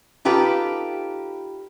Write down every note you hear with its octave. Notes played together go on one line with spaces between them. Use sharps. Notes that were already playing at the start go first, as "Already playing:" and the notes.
D#4 F4 G4 A4 B4